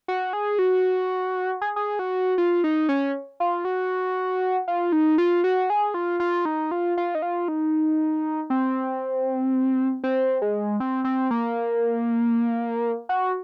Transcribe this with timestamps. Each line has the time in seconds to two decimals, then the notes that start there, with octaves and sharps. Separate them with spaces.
0.08 F#4
0.33 G#4
0.59 F#4
1.62 G#4
1.76 G#4
1.99 F#4
2.38 F4
2.64 D#4
2.89 C#4
3.40 F4
3.65 F#4
4.68 F4
4.92 D#4
5.18 F4
5.44 F#4
5.70 G#4
5.94 F4
6.20 F4
6.45 D#4
6.71 F4
6.97 F4
7.15 D#4
7.22 F4
7.48 D#4
8.50 C4
10.04 C4
10.42 G#3
10.80 C4
11.04 C4
11.31 A#3
13.09 F#4